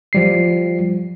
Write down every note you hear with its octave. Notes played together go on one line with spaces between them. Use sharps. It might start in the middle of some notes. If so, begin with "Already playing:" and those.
F3 G3 C7